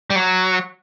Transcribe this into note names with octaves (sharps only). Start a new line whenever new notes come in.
G3
F#3